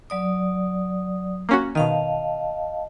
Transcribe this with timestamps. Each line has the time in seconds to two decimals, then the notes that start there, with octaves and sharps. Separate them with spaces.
0.10 F#3 D5 D#6
1.49 A#3 C#4 F#4
1.75 B2 D#3 D#5 F5 A5